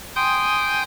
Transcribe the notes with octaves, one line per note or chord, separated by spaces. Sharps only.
G5 G#5 C6 D#6 G6